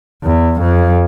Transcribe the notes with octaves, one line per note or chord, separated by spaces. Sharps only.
E2
F2